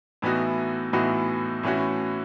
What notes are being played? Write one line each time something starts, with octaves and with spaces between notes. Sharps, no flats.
A2 E3 B3 D#4 F#4
A2 E3 B3 D#4 F#4
A2 E3 A3 C#4 F#4